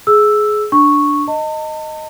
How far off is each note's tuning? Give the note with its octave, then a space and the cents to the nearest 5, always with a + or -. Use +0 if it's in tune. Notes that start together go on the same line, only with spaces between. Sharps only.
G#4 +20 E6 +0
D4 +0 C#6 -5
D#5 +0 A5 +45